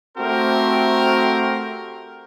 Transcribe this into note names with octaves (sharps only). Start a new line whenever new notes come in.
A3 C4 F#4 G4 A#4 C5